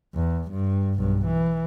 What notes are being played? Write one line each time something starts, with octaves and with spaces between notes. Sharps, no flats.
E2
G2
B1 G2
E3